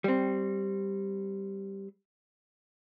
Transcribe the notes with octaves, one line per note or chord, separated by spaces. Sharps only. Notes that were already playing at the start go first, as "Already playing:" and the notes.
G3 C4